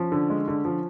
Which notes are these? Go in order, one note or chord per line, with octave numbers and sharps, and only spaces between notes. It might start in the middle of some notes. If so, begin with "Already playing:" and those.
Already playing: F3 C#4
D3
G#3
D3
F3